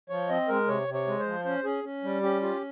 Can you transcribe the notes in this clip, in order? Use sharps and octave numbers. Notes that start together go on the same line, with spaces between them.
F3 C#5
C4 D#5
G#3 A#4
C3 C#5
C3
C#5
G#3
C5
F3
C#4 C5
C#4 G#4
C#4
G3
C#4 G4
F4 G4